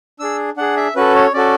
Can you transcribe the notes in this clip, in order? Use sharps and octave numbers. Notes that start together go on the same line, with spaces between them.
D4 G#4 E6
D4 G#4 F#5
E5
C#4 F#4 A4 B4
C#5
C#4 F#4 A4 D5